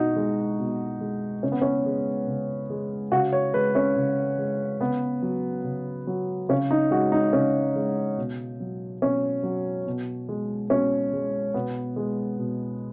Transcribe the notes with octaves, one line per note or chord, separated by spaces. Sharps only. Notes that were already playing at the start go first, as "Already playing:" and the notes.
Already playing: B2 D#4 F#4
G#3
B2
G#3
C#3 C#4
B3
C#4
G#3
C#3
G#3
C#3 F#4
C#5
G#3 B4
C#4
C#3
G#3
C#3 B3
F#3
C#3
F#3
C#3 C#4
D#4
G#3 F#4
D#4
C#3 C#4
G#3
B2
F#3
B2 C#4
F#3
B2
G#3
B2 C#4
G#3
B2 B3
G#3
B2